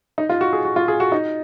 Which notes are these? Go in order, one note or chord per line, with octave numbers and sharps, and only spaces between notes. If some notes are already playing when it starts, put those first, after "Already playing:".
D#4
F4
F#4
G#4
F#4
F4
G#4
F#4
D#4